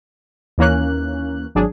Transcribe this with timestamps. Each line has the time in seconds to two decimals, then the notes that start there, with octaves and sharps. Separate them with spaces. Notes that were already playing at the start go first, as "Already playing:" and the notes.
0.58 D#2 E3 A#3 C#4 F#6
1.55 G#1 F#3 D4 G#4